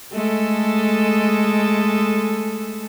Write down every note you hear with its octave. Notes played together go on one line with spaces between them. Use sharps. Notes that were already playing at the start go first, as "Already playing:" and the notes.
G#3 A3 A4